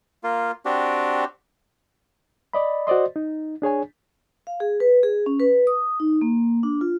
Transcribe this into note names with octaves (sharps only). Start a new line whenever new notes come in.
A#3 F4
C4 D4 F#4 G4
D5 D#5 B5
F#4 C5 D5 D#5 C6
D#4
D4 G#4 C#5 G#5
F5
G#4
B4
G#4
C#4
B4
D#6
D#4
A#3
D4
F4